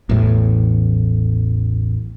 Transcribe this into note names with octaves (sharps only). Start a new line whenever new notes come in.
A1 E2 A2